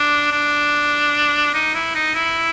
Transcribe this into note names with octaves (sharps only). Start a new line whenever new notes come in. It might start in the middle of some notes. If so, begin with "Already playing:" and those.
Already playing: D4
D4
D#4
E4
D#4
E4